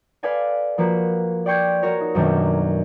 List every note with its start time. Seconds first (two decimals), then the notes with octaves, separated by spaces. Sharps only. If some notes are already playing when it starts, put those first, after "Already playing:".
0.23 A4 B4 D5 F5 G#5 A5
0.78 F3 A#3 F#4 B4
1.46 D5 G5 C6 C#6 G6 G#6
1.82 F#4 A#4 C#5 A#5
2.01 D#4
2.15 F#2 B2 D#3 A3 A#3 D4